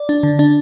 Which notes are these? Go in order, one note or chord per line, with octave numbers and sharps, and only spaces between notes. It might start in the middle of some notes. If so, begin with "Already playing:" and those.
Already playing: D5
D4
D3
D4